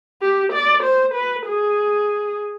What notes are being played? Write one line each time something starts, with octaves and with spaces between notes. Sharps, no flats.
G4
D5
C5
B4
G#4